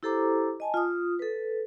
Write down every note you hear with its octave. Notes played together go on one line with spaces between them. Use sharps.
E4 G4 A4 C5 A#5 D6
D#5 G#5 A5
F4 D#6
A4 B4